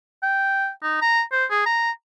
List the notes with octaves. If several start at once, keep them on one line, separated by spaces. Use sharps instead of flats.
G5
D#4
A#5
C5
G#4
A#5